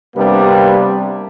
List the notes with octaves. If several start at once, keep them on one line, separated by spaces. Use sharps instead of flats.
C3 G3 A#3 B3 D4